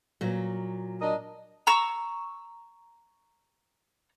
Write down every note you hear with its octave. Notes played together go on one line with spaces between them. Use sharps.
A#2 F#3
D4 A#4 D#5
A#5 C#6 E6